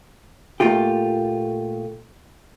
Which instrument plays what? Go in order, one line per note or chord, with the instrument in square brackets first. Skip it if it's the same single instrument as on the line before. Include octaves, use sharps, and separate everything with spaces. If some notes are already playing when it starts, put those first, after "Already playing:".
[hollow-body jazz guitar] A#2 A3 F4 G4